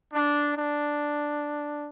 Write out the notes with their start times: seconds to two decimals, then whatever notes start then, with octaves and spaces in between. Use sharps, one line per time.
0.14 D4
0.56 D4